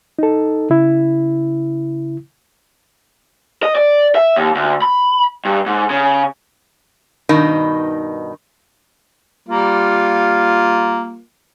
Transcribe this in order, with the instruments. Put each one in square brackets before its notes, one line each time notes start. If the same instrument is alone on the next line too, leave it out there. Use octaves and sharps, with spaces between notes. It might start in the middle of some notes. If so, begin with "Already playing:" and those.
[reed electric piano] D#4 A4
C#3 E4
[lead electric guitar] D#5
D5
E5
D#2
D2
B5
G2
G#2
C#3
[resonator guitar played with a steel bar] G2 B2 D#3 D#4
[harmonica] G3 A#3 F4